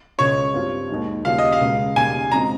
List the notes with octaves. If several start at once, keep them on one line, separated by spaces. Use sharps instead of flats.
C#2 C#3 G#3 C#4 F4 C#5
G2 G3 C4 F4
D#2 D#3 G#3
D#2 C#3 G3 C#4 F4 F5
D#5
F5
C#2 C#3 G#3
D#2 C#3 G3 G#5
F2 C#3 G#3 C4 D#4 A#5